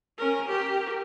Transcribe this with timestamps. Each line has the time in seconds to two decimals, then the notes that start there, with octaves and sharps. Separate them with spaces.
0.18 C#4 A#4
0.48 G4 A#4